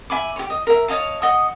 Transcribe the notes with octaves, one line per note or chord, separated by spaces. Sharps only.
E5 G#5 B5 D6
G4 C#5
D#5
A#4 E5
C#5 D#5 F5 A5
D#5 F#5 D#6